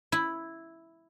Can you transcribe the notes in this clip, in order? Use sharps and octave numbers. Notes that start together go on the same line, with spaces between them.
E4